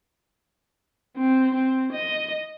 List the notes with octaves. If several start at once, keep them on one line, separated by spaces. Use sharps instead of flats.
C4
C4
D#5